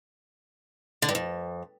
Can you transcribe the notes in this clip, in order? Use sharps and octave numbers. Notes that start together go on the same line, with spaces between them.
D3
G2
F2